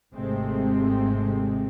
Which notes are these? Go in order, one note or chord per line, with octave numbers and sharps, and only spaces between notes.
G#1 G#2 C3 G#3 A3 C4